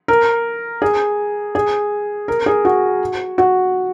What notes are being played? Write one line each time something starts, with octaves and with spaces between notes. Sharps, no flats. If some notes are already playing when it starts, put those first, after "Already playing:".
A#4
G#4
G#4
A#4
G#4
F#4
F#4